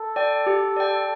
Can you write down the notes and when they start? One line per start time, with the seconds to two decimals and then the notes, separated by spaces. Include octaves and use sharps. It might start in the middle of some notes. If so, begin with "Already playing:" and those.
Already playing: A4
0.16 D5 G5
0.47 G4
0.77 D5 G5